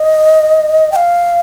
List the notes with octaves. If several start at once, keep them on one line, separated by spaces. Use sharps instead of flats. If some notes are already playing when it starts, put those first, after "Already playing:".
Already playing: D#5
G5
F5